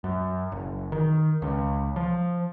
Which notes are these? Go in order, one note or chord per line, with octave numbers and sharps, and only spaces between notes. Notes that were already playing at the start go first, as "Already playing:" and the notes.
F#2
F#1
D#3
C#2
F3